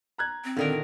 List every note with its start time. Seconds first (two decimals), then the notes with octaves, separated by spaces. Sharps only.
0.18 A#5 F#6 G#6
0.44 C4
0.57 A#2 D3 D#3 A#4